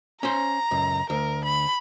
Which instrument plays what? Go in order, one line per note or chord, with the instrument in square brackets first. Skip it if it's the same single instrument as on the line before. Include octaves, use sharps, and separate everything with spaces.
[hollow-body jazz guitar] C#4 C5 [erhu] A#5
[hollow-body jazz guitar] C#2 F#2
[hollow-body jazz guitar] D2 [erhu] A#4
[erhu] B5